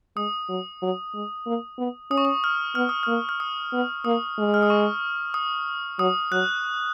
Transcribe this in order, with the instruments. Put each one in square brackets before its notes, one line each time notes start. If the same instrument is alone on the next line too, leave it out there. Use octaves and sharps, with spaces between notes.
[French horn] G#3 [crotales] D#6
[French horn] F#3
F#3
G#3
A#3
B3
[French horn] C#4 [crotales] D#6
[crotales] C#6
D#6
F6
[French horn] B3 [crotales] F6
[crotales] D#6
[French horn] A#3 [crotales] F6
[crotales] F6
D#6
[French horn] B3
[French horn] A#3 [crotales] D#6
[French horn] G#3
[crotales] F6
D#6
C#6
D#6
[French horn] F#3 [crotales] D#6
[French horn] F#3 [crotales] F#6